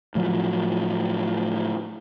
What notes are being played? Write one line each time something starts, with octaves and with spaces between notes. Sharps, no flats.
A2 F3 F#3